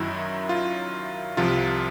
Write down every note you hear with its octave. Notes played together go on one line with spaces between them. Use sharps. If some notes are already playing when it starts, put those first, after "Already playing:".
Already playing: F#2 D#3 F#3 E4
F4
C2 C3 F3 F4